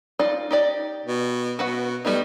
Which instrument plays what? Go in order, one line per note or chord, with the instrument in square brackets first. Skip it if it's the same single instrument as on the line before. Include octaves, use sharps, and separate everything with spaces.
[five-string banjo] D#4 F4 D5
D#4 G4 D5
[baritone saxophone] B2
[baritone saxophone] B2 [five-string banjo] F#4 B4 F#5
[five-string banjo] G3 A3 D#4 [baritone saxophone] B3